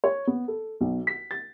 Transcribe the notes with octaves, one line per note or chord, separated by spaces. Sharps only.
C#5
B3
A4
B1
B6
A6